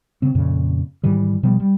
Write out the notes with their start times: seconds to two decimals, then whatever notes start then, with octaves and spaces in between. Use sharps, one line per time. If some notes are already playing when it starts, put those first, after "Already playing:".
0.22 C#3 C4
0.35 F2 A#2 C#3
1.04 G#2 D#3 E3 G3
1.43 B2 F3 G3 B3
1.60 G3